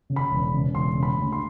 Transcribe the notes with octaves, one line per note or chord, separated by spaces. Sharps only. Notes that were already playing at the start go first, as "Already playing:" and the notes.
C#3
B5
E1
C#3
E1 C6
C#3
B5
D2
C6